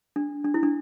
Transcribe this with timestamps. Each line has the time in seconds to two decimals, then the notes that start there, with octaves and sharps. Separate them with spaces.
0.16 D4
0.44 D4
0.54 E4
0.63 D4